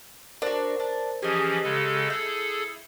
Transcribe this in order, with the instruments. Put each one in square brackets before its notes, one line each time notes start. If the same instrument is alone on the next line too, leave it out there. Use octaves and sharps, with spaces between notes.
[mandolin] D4 F#4 [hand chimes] A#4 C5
[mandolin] D4
[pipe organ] E3 F3 C#4 [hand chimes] G4 [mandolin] G#4 D#5
[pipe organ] C#3 G#3 A4
[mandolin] E4 [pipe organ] G#4 A4 [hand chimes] G6